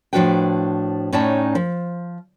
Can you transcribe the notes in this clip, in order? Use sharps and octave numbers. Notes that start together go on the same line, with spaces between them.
A2 F3 D4 F#4 B4 G5
A2 C#4 D#4 D5 G5 A5
F3